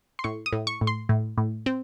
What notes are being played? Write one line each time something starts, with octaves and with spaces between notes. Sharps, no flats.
C6
A2 C#6
D#6
A2
C#6
A2
C6
A2
A2
C4